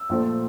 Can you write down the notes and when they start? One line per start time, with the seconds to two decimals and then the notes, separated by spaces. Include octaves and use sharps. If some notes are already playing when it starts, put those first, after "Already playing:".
Already playing: E6
0.09 A#1 A#2 F3 A3